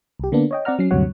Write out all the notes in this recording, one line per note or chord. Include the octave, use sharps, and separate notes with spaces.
C2 G4
D3 A#3 B3 D4
C#5 D#5 G5
C4 D5 F#5 A#5 F6
F#3 C#4 C7
D2 G2 C3 F#3 C#5 F#5